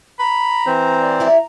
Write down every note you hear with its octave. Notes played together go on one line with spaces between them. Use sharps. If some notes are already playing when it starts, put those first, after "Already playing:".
A#5 B5
E3 C4 C5
D5
E4 G4 E5